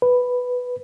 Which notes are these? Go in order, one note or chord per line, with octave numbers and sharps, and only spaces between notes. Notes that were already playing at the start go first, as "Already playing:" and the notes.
B4